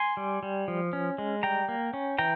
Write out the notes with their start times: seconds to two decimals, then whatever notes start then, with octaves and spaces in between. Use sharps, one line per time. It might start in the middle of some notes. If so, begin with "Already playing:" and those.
Already playing: G#5 C6
0.17 G3
0.43 G3
0.68 F3
0.93 C#4
1.18 G#3
1.43 G3 G5 A#5
1.69 A#3
1.94 C#4
2.18 E3 G5 A#5